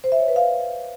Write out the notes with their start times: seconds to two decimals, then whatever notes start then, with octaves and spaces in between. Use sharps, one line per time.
0.04 C5
0.12 E5
0.20 C#5
0.28 B4
0.36 F5